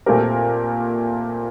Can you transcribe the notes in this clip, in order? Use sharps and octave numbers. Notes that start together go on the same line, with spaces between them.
A#2 A3 C4 G4 A#4